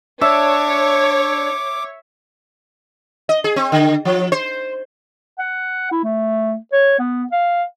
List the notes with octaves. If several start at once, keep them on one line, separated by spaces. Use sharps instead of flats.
D4 C#5 E5 D6
D#5
G#4
C4
D3
F3
C5
F#5
E4
A3
C#5
B3
F5